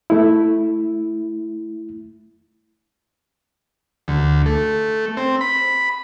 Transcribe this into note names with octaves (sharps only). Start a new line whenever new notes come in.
A3 E4
D2
A3
C4
B5